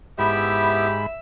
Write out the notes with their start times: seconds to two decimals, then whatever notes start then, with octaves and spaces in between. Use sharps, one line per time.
0.19 G#2 B3 E4 G4 E5 B5